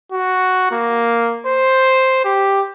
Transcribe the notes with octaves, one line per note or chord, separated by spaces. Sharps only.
F#4
A#3
C5
G4